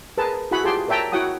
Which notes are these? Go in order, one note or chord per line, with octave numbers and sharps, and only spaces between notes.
G#4 A#4 B4 A5
E4 F#4 G#4 F#5 G#5 B5
F4 G4 G#4 G5 A5 C6
A#4 C#5 E5 G5 A5 A#5
E4 F#4 C#5 F#5 G5 D#6